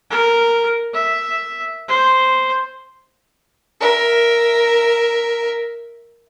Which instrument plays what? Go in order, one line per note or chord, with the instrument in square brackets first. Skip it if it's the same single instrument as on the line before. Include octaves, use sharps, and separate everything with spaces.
[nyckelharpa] A#4
E5
C5
[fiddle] A#4 E5